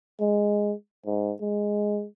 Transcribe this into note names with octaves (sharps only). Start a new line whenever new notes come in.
G#3
G#2
G#3